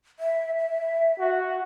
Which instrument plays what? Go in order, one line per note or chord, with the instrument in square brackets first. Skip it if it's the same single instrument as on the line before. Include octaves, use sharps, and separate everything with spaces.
[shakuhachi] E5
E5
[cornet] F#4